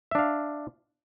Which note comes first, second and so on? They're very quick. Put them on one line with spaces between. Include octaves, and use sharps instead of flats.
E5 D4 F5